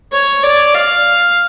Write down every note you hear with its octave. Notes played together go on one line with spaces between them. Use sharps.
C#5
D5
F5